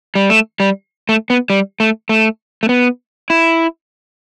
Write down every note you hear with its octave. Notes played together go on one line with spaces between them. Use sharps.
G3
A3
G3
A3
B3
G3
A3
A3
A3
B3
E4